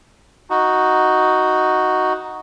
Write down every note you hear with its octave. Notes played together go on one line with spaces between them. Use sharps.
D#4 F#4